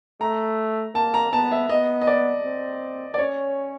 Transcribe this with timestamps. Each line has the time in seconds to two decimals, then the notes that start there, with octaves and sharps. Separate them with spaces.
0.21 A3 A#5
0.94 A#3 A5
1.14 A#5
1.33 B3 A5
1.51 E5
1.69 B3 D#5
2.01 D#5
2.07 D5
2.45 C4
3.14 D5
3.18 C#4 C#5